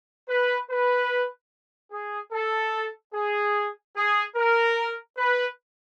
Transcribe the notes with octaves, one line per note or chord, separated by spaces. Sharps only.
B4
B4
G#4
A4
G#4
G#4
A#4
B4